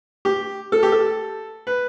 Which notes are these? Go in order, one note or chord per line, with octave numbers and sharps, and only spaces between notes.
G4
A4
G4
A4
B4